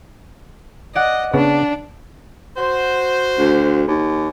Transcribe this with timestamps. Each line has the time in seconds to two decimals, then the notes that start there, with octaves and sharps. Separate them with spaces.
0.95 D5 D#5 F#5
1.34 C#3 B3 D4
2.57 F#4 C5
3.39 D2
3.88 D#2